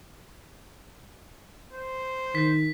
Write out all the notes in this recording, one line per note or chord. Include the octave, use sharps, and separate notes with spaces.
C5
D#3 B6